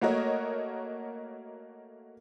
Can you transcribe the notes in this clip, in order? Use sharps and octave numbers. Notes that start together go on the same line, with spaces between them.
A3 A#3 F#4 A#4 C#5 D#5